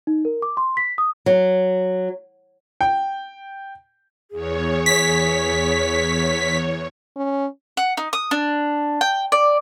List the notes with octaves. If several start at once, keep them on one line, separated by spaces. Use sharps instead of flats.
D#4
A#4
D6
C6
B6
D#6
F#3
G5
E2 G#4 C#5
B6
C#4
F#5
D#4
D#6
D4
G5
D5